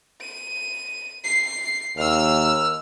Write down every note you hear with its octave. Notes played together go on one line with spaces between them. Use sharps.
D#7
C7
D#2 E6 F6